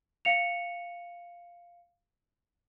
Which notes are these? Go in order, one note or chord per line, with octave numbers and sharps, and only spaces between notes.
F5 C#7 F7